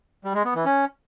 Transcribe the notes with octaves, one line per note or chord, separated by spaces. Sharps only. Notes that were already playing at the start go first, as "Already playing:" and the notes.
G3
G#3
B3
E3
C#4